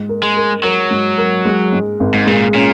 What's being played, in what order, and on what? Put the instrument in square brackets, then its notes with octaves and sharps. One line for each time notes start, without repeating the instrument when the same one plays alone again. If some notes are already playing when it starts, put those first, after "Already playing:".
Already playing: [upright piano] G#2
A#4
[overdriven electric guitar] G#3
[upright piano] A#4
[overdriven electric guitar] F#3 [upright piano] A#4
[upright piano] G#2
A#4
G#3
G#2
G#1
[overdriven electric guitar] G#2
[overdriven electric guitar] A#2 [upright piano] G#3
[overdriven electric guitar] A#2 [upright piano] C#4